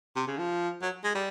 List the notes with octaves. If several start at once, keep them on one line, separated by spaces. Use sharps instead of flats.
C3
C#3
F3
F#3
G#3
G3